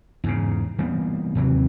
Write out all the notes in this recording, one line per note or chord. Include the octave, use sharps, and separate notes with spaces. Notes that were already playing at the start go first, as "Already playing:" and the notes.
E2 G#2 C#3
E3 G3 A#3 B3
D#2 C3 E3 F#3